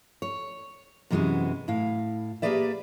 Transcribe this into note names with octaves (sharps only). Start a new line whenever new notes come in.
C#5
F#2 C3 E3 G#3 B3 F#4
A2 E4 F5
A#3 G4 G#4 B4 D5 E5